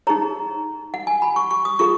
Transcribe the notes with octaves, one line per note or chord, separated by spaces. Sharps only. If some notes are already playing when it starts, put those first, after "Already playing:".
D#4 G#4 C#5 A#5
F#5
G#5
B5
C#6
C#6
D#6
F4 G#4 C#6